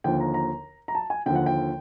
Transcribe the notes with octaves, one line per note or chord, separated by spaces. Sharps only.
D#2 D3 F3 G5
A#5
A#5
A#5
A5
G#5
D#2 D3 F3 G5
F#5
G5